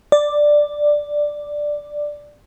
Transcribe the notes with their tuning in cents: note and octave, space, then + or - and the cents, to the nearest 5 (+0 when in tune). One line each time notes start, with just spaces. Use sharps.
D5 +5